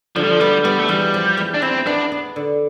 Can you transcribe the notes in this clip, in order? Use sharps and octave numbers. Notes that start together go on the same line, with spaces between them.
D3 F3
G3
F3
G3 B3
G3 B3
A3
E2 G3
F3
E2
D4
C4 E4
B3 D4
B3
D3